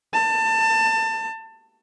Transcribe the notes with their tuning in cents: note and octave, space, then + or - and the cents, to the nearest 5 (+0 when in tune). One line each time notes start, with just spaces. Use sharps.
A5 +25